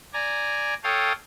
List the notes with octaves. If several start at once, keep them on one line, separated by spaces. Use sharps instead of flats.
D5 G#5 A#5
A4 C#5 F5 G5 D#6